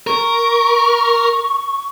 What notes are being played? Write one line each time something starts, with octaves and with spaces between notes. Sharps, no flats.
A#4 C#6